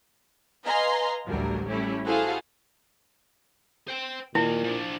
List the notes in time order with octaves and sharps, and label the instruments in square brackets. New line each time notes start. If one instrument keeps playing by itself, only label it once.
[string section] B4 D#5 F5 G#5 A#5 C6
A1 D2 F#3 G3 A#4
G3 A3 C#4 E4
E4 F#4 G#4 A4 C5 F5
[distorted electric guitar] C5 G5
[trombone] A#2 [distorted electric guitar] D#3 A#3 [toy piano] E4
[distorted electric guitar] F3 D4